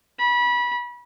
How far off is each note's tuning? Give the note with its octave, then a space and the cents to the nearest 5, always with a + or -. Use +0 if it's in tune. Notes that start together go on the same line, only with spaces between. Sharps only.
B5 -25